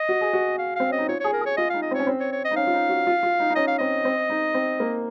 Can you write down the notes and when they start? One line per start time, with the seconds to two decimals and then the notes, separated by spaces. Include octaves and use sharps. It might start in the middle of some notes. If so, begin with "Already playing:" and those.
Already playing: D#5
0.09 F#4
0.21 G#4
0.33 F#4
0.59 F5
0.76 C4 F5
0.89 C#4 D#5
0.98 D#4
1.08 F4 C#5
1.20 G#4 C#5
1.33 A#4
1.41 G#4
1.46 C#5
1.57 F4 D#5
1.70 D#4 F5
1.82 D#5
1.91 C4
1.95 C#4 C#5
2.07 C4
2.20 C#5
2.32 C#5
2.45 D#5
2.51 D#4
2.56 C#4 F5
2.67 F4
2.74 D#4
2.89 F#4
3.07 F4
3.23 F4
3.40 D#4
3.50 D#4
3.56 C#4 D#5
3.68 F5
3.78 C4 D#5
4.05 C4
4.30 D#4
4.54 C4
4.80 A#3